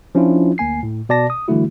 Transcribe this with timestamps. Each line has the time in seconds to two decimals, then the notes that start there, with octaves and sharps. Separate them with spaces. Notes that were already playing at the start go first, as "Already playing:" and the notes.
0.15 F3 C#4 D4 E4 F4
0.58 D2 A#3 G#5 C7
0.83 A2
1.09 B2 D5 A5 A#6
1.30 D#6
1.48 D3 E3 G3 A3 E4 F#4